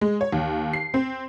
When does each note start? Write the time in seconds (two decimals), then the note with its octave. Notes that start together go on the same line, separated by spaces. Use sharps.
0.01 G#3
0.21 C#5
0.32 D#2
0.73 C7
0.94 C4